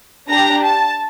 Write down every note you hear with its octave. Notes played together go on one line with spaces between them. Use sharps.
D4 G4 A#5
A5